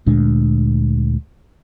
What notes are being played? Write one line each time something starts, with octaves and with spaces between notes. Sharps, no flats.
D2 A#2 G#3 D4